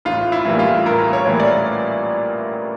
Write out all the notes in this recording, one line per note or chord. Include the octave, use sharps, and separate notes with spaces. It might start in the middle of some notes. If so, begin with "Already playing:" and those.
A1 F4
E4
A2 E3 G3 A#3
F4
A1 A#4
C#5
A2 E3 G3 A#3
D5